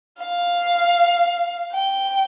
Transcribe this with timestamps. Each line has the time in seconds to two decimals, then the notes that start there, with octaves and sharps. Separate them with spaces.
0.21 F5
1.73 G5